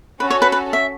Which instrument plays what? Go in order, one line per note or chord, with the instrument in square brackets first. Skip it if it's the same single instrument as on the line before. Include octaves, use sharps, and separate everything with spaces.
[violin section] C#4 F#4 A4 [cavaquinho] B4
[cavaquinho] C#5
B4
B4
E5